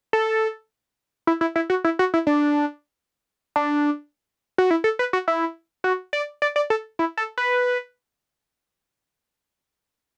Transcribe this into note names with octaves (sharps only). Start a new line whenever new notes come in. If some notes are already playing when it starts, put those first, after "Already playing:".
A4
E4
E4
E4
F#4
E4
F#4
E4
D4
D4
F#4
E4
A4
B4
F#4
E4
F#4
D5
D5
D5
A4
E4
A4
B4